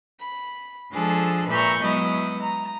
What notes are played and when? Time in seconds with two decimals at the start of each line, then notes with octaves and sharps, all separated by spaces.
0.20 B5
0.91 F3 G#3 D4 G#4 A4
1.49 A#2 B4 E5 A#5 C#6 G6
1.83 F#3 G#3 B3 E4 D#5
2.42 A#5